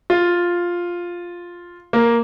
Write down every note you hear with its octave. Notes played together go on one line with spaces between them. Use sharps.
F4
A#3